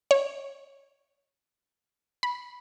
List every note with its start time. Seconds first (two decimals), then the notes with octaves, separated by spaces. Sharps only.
0.11 C#5
2.23 B5